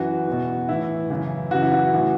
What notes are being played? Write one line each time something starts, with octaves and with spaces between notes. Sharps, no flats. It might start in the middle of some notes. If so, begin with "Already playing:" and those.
Already playing: F#2 E3 F#4
E2 B2
A2 E3 E4
F#2 C#3 E3
F#2 C#3 E3 F#4
E4
F#4
A2 E3